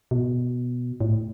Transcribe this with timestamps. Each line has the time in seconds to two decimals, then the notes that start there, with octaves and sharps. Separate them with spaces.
0.11 B2
1.01 A2